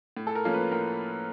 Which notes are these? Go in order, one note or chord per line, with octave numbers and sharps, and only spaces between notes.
A2
A4
A#4
F3 A#3 C#4 F4
B4
A2 A#4